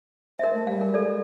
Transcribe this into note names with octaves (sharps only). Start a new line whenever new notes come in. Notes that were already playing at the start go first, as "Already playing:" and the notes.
A#4 C5 D#5 E5
A3
G3 F5
A#4
G#3 A4 D5